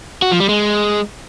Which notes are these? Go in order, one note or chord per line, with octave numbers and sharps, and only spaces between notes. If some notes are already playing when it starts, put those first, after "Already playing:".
F#4
F3
G3
G#3